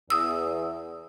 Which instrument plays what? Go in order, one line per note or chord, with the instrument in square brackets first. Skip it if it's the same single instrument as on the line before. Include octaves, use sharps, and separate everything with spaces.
[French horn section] E2 [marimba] D#6 E6